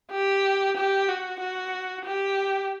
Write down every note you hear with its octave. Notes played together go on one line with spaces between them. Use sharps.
G4
G4
F#4
F#4
G4